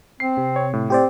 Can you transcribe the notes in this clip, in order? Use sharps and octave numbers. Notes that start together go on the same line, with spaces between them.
C4 C7
C3
C#5
A2
C4 G4 C5 D5